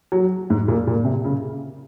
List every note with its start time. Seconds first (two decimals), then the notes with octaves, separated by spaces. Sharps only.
0.12 F#3
0.50 G#2
0.68 A#2
0.87 A#2
1.05 C3
1.25 C#3